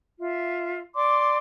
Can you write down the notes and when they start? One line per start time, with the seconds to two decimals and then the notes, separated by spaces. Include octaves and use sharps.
0.19 F4 E5
0.95 D5 C6 D6